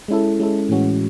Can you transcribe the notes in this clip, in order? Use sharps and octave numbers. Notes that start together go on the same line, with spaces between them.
G#3 C#4 E4 A4
G#3 C#4 E4 A4
A2 E3 G#3 C#4 F#4